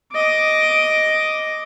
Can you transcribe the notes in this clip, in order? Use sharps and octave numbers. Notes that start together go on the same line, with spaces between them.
D#5 D6